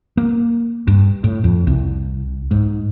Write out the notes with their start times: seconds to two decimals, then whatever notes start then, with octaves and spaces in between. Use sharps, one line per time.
0.17 A#3
0.87 G2
1.24 A2
1.44 F2
1.67 C2
2.51 G#2